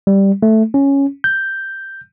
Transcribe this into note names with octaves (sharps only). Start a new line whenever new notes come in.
G3
A3
C#4
G6